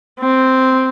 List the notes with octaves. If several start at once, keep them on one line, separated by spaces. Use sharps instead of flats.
C4